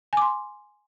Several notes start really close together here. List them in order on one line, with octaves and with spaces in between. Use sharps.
G#5 D6 C6